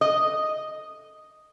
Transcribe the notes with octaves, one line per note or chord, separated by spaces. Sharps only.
D#5